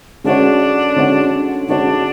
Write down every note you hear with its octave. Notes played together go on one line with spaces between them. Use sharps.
D3 G#3 C#4 D4 F#4 C#5
D3 G#3 C#4 F#4 C#5
D3 G#3 C#4 D4 F#4 C#5